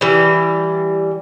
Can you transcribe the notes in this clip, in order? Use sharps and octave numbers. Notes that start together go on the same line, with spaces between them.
E3 G3